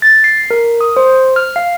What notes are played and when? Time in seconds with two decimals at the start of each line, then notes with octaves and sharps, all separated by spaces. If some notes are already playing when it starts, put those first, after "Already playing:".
0.02 A6
0.24 C7
0.51 A#4
0.81 D#6
0.97 C5
1.36 F6
1.56 F5